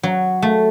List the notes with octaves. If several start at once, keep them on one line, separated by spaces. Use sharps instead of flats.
F#3
A3